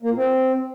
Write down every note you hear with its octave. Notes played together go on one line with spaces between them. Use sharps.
A#3
A#2
C4